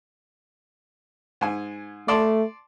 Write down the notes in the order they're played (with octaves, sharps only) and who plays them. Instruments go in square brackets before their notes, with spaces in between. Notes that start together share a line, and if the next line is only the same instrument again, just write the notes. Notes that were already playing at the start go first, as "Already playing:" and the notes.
[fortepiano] G#2 G#5
[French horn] A3 [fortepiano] D5 A5 C6